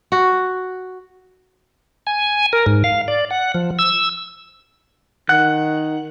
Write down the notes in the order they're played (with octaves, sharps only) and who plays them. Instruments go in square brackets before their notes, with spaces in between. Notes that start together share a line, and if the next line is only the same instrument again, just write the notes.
[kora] F#4
[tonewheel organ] G#5
A#4
G#2
F5
D5
F#5
F3
E6
[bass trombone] D#3 [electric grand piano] F#5 [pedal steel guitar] F#6